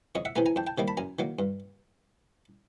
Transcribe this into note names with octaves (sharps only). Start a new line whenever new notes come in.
F2 C#5 D#5
E5 F#5
C3 E3 A3 G#5 A#5
G#5 A#5
F2 G5 A5
G5 A5
C3 D#3 G3 A#3
A5 B5
F#2 G#5 A#5
D#3 F#3 A#3
G2